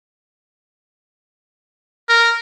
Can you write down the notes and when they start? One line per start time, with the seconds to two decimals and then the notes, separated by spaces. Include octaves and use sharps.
2.09 A#4